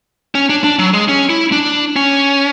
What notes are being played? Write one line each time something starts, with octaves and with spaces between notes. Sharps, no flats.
C#4
D4
D4
F#3
G#3
C#4
E4
D4
C#4